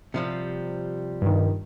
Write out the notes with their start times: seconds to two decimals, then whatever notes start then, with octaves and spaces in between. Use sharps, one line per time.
0.14 C3 F3 G3
1.22 G2 D#3